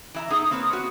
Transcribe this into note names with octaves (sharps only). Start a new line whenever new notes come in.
E3 E5 A#5
B3 D#4 G#4 A4
A#3 C4 B4 C#5
B3 F#4